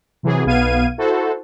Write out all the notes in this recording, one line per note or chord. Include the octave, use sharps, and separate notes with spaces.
C3 E3 F#3 G#4
B1 B2 B3 F5 G#6 D#7
E4 F#4 A4 C5